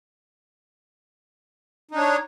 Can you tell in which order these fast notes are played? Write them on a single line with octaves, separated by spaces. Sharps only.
D#4 D4 C#5